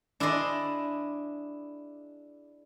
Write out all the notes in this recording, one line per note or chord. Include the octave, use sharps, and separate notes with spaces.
D4 E4 G#4 D5 D#5 C6